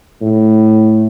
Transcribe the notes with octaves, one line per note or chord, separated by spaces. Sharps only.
A2